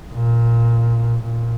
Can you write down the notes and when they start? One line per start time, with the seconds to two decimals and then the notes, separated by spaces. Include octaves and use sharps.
0.12 A#2
1.22 A#2